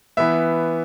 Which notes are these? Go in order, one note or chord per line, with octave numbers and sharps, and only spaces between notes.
E3 B3 E5